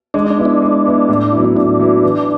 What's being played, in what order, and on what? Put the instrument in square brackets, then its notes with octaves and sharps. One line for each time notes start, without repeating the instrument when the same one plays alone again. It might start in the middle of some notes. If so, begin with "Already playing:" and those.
[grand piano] G#3 [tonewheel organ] D4
[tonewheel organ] D4
[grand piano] B3 E4
[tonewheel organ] D4
[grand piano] G#3
B3 E4
A2
F#3 B3 E4
[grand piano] A2 [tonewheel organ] D4
[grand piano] F#3 B3 E4
E3